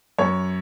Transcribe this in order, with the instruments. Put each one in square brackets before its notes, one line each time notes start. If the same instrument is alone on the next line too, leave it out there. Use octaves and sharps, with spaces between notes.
[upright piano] F#2 C#5